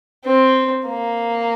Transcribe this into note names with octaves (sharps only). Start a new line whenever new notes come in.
C4
A#3